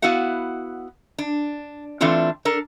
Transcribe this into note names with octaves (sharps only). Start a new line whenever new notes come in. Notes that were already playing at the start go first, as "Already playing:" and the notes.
B3 E4 F#4 F5 F#5
D4
E3 A3 C4 D4 F4
D4 A4 A#4